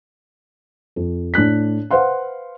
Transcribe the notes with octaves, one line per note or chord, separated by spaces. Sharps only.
F2
A2 D4 F#6 B6
B4 C5 F5 F#5 C6